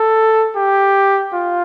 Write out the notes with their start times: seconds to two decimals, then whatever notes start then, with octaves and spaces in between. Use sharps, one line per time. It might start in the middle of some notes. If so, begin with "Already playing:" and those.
Already playing: A4
0.56 G4
1.34 F4